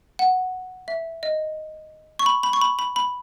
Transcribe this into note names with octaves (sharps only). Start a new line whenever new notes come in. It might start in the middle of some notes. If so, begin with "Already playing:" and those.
F#5
E5
D#5
C#6
B5
B5
C#6
B5
B5
B5